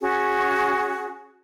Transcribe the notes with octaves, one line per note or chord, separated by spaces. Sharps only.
C#4 F#4 G#4